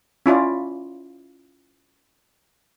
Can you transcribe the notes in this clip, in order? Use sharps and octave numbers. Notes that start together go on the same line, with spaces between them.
C#4 E4 F4 D5